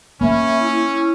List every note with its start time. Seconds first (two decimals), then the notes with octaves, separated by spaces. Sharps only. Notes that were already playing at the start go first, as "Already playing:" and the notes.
0.21 A#3 C#4 E5 B5
0.61 E4